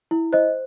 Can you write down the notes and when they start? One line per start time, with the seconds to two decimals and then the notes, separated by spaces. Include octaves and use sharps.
0.11 E4
0.33 C5 D#5